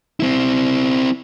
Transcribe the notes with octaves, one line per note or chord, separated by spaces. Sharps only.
C4 E4